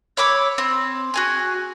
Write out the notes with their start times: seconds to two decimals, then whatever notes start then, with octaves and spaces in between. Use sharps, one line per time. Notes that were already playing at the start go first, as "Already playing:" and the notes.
0.17 C#5 B5 D6 E6
0.58 C4
1.14 F#4 G#4 G#5